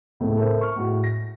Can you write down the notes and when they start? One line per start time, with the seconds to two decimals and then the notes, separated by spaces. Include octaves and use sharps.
0.20 C#2 A2 C3 A3
0.37 A4 A#4 C5 E5
0.61 C#6 F6
0.76 A2 G#3 F#4
1.04 A#6